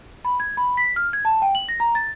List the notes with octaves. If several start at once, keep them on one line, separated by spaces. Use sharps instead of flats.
B5
G#6
B5
B6
F6
G#6
A5
G5
F#7
A#6
A#5
A6